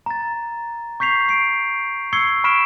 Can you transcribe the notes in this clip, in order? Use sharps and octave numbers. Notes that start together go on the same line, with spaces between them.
A#5 A6
C#6 G6 B6 C7 F7
C7 D7
C#6 E6 G#6 C7 C#7 G7
B5 C#6 F6 B6 D7 E7